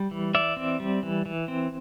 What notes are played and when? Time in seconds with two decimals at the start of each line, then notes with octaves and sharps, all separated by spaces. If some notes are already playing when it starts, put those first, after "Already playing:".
Already playing: G3
0.11 E3
0.35 E3 D5 E5
0.56 C4
0.80 G3
1.03 E3
1.26 E3
1.48 C4